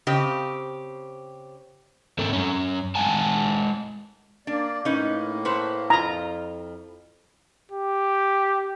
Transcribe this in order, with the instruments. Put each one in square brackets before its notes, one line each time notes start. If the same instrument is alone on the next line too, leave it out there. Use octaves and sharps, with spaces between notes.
[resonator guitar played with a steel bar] C#3 C4 G4 D#5
[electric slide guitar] G#2 C4 A4 A#4
F#2 C#4
G#3 F#5 G#5 A5
[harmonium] A#3 D5 [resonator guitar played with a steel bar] D4
[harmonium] A2 A#3 [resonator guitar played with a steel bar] C#4 D#4 B4
[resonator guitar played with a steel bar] A3 B4 C5
[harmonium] F2 [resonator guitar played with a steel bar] E4 F4 [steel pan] A#5
[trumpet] G4